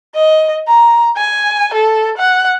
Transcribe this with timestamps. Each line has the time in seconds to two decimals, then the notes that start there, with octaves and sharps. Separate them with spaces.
0.15 D#5
0.68 A#5
1.17 G#5
1.73 A4
2.17 F#5